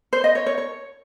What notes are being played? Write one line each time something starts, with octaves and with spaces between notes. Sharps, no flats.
C5
D#5
C#5
C#5
C#5